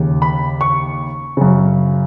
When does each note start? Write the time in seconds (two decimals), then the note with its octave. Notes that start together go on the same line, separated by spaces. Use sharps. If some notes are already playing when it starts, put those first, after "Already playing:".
Already playing: D#2 C#3
0.22 B5
0.61 C#6
1.37 F#2 C#3